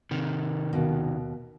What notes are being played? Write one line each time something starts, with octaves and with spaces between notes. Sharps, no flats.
C3 D#3
D#2 B2